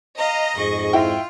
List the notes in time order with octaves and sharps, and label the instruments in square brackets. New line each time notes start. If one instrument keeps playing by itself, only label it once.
[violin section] D#5 [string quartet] F5 A#5
[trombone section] F2 G#2 [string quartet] G#4 C#6
[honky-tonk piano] E4 G5 [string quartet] F4